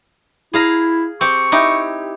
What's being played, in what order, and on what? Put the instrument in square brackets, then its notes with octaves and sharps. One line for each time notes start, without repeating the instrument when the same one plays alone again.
[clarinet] E4 [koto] G#4 F5 A#5
[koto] C4 G4 [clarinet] C#6
[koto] D#4 E4 G4